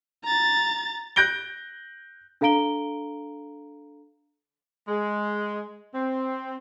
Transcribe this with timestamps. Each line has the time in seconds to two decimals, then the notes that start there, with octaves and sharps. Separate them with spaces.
0.24 A#5 A6
1.16 F#6 G6 A#6 D7 G7
2.41 D4 A4 F5 A#5 D7 G7
4.88 G#3
5.94 C4